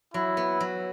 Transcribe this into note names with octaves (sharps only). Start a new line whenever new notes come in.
F#3 E4
B3
F#3